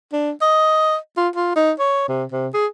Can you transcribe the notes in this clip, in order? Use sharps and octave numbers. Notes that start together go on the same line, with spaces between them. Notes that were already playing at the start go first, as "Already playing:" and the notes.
D4
D#5
F4
F4
D#4
C#5
C3
C3
G#4